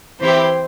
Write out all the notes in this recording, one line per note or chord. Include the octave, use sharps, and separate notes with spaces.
E3 C4 E4 G4 C5